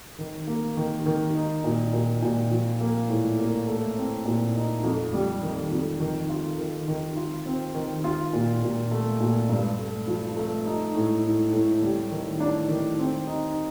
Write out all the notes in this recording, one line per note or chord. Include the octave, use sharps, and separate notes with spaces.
D#3
A#3
D#3
D#3
D#4
A#2
A#2
A#2
F3
A#3
A2
A#3
A3
C4
A#2
D#4
F2
G3
D#3
F2
D#3
F4
D#3
D#3
F4
C4
D#3
F4
A#2
A#2
A3
A#2
G2
A3
F3
A3
D#4
A2
A2
A2
G3
D#3
D4
D#3
C4
D#4